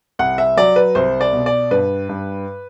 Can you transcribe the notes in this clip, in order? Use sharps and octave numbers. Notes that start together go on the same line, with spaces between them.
C2 F#5
E5
F#3 D5
B4
C2 C5
D5
B2
D5
G2 B4
G2